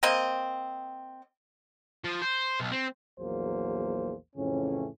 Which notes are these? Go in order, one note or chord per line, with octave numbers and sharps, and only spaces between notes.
A#3 C4 D#5
F3
C5
B1
C4
A#1 E2 F#3 A#3 G#4 C5
F2 A2 C#3 E3 C#4